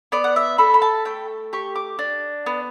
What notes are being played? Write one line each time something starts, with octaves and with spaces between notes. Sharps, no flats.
B3 D5
F#5
E5
A4 B5
B5
A5
A3 G5
G4 C#6
D6
D4
B3